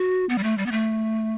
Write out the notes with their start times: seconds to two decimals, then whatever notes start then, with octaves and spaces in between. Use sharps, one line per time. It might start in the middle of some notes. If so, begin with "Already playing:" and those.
Already playing: F#4
0.29 B3
0.38 G3
0.43 A3
0.58 G3
0.66 B3
0.71 A3